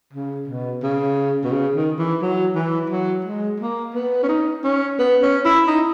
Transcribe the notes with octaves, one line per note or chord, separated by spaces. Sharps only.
C#3
B2
C#3
B2
C#3
D#3
E3
F#3
E3
F#3
G#3
A#3
B3
C#4
D#4
C#4
B3
C#4
E4
D#4